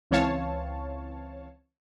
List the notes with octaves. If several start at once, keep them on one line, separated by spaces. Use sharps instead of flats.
C#2 E3 C4 C#5 F5 A5